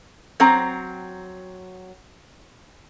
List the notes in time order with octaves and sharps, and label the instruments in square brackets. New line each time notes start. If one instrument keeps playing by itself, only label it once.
[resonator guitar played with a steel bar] F#3 C4 A#5